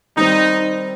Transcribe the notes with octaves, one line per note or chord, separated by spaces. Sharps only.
D#3 G3 C4 D#4